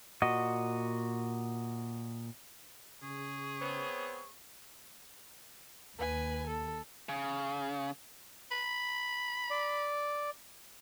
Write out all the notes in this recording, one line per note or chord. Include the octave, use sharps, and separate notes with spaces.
A#2 F#4 D#5
C#3 G#4 C#6
B3 C4 C#5
D#2 B4 G#5
A4
C#3
B5
D5